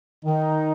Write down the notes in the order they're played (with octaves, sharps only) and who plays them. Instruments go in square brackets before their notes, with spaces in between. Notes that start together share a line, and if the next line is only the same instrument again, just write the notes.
[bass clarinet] D#3 [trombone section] D#4